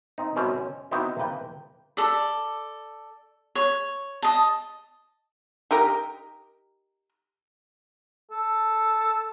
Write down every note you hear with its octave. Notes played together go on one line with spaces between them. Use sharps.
C4 D#4
F#2 B2 G3 C4 C#4
C#4
B3 C4 D#4 E4 F#4 G4
C3 A#3 B4 G5
A4 D5
C#5
D#5 A5
D#4 G4 A#4
A4